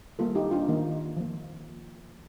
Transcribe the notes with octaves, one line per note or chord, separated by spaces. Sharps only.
D#3 G3 A#3 F4 A4
D#4 G4
D4 F4
D#3 A#3 D#4
F3 A#3